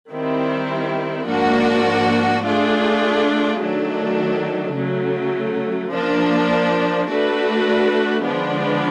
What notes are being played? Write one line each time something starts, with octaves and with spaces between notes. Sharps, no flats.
D#3 G3 C4 E4
G#2 F3 A#3 D4 F#4
A3 D4 F4 G#4
D#3 F#3 A3 D4
C#3 F#3 A3
F3 A#3 D4
A3 D4 F#4 B4
D3 F3 G#3 B3 D4